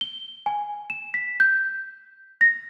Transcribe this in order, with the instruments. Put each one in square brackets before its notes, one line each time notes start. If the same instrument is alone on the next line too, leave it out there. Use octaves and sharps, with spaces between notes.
[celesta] G7
G#5
E7
B6
G6
A#6